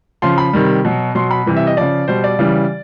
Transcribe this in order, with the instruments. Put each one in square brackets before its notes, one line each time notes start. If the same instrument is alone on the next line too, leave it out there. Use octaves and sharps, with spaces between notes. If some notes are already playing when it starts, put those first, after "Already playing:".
[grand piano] C#3 F3 C6
B5
C3 D#3 G3
B2 F#3
B2 F#3 C6
B5
C3 E3 G3
E5
D#5
C#3 F3 D5
B2 G3 C5
D5
C#3 E3 G3